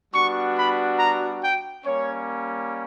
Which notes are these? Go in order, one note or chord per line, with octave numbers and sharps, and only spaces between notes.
G3 B3 D4 F#4 C#6
B5
A#5
G5
G3 A#3 C#4 C#5